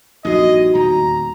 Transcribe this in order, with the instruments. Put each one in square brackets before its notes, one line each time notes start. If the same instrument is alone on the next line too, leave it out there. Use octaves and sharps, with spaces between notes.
[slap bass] A#1 G2 [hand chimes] D#4 F#4 [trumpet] D#5
[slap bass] D#1 E2 [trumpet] A#5